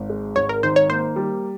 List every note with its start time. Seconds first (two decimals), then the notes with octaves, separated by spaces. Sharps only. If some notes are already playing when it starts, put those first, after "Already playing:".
Already playing: G#1
0.10 G#3
0.36 G#1 C#5
0.49 A#4
0.63 D#3 C5
0.76 C#5
0.90 A#3 C5
1.16 G3